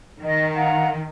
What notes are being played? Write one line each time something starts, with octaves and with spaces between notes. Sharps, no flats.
D#3 D#5
F5 F#5 A#5